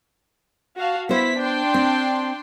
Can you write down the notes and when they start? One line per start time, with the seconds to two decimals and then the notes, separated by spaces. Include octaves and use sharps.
0.78 F#4 F5 A5
1.09 B3 E4 C5 B6
1.39 D4 G5 C6
1.74 C4